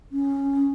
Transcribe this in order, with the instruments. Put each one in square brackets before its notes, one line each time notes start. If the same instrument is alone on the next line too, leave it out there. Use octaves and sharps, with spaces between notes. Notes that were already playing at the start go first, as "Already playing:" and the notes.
[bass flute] C#4